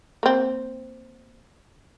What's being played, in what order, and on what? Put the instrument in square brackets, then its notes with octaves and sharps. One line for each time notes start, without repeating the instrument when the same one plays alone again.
[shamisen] A#3 C4